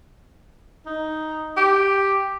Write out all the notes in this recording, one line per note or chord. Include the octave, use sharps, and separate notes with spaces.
D#4
G4